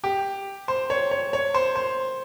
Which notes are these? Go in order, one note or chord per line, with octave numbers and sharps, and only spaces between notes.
G4
C5
C#5
C#5
C#5
C5
C5